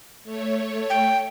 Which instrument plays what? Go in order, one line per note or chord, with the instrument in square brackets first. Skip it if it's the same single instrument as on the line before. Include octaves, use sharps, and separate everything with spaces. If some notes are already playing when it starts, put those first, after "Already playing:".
[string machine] A3 C#5
[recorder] G5